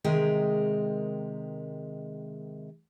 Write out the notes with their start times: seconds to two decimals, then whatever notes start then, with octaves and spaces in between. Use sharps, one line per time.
0.04 C3 D#3 G#3 G#4 A#4 G5